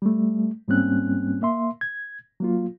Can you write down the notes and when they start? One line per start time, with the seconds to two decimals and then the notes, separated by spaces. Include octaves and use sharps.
0.02 G3 A3
0.68 G#2 G3 A#3 C4 C#4 F#6
1.42 A#3 E5 C6
1.81 G#6
2.40 F#3 A#3 F4